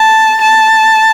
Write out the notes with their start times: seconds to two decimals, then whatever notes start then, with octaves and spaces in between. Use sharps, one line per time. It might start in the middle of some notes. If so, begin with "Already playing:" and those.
Already playing: A5
0.41 A5